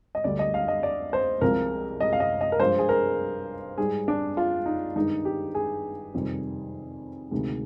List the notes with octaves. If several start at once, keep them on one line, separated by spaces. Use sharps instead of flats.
D#5
D2 D3 G3 D5
D#5
F5
D#5
D5
C5
C2 C3 F3 G#3 A#4
D#5
F5
D#5
D#5
A#4
G2 F3 G#3 C5
G#4
A#4
G#2 G3 G#4
D4
F4
D#4
G2 D#3 G#3 D#4
G4
G#4
F2 C3 D#3 G3
D2 C3 D#3 G#3